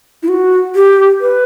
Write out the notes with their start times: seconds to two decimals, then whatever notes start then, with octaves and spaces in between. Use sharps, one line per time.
0.23 E4
0.28 F#4
0.75 G4
1.21 B4